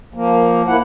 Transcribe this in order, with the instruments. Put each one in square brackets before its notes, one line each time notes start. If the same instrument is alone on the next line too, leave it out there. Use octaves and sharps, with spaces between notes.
[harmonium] F3 A#3
A2 A#3 E4 F#5